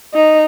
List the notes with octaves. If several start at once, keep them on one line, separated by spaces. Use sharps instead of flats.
D#4